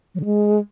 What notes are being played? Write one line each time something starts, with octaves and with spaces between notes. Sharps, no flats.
F#3
D3
G#3